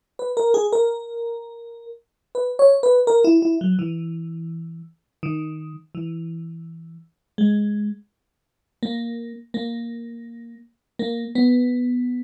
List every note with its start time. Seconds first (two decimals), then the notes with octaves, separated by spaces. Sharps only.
0.19 B4
0.37 A#4
0.54 G#4
0.73 A#4
2.35 B4
2.59 C#5
2.83 B4
3.07 A#4
3.24 E4
3.42 E4
3.61 F#3
3.79 E3
5.23 D#3
5.95 E3
7.38 G#3
8.83 A#3
9.54 A#3
10.99 A#3
11.35 B3